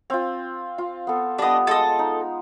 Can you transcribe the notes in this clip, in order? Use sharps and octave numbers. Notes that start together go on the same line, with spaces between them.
C4 F4
F4
B3 A4
G3 B3 D4 D#5
G#3 A4 D#5
D#4